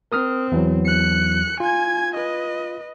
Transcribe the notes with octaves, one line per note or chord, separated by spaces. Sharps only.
C4 A#4 D#6 F6
E2 E3 F#3
F#6 C#7
F4 G#5 G#6
B4 D#5